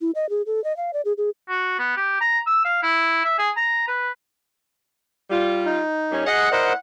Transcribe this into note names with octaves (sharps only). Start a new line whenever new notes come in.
E4
D#5
G#4
A4
D#5
F5
D5
G#4
G#4
F#4
B3
G4
A#5
E6
F5
E4
E5
G#4
A#5
B4
G3 F4
D#4
A#2 G3 C#4
G#4 D#5 F#5
E4 A#4 C5 D5 D#5 F#5